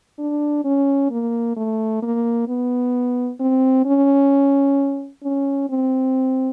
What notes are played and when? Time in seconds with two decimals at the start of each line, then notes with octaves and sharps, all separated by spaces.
0.19 D4
0.65 C#4
1.11 A#3
1.57 A3
2.02 A#3
2.48 B3
3.40 C4
3.86 C#4
5.23 C#4
5.70 C4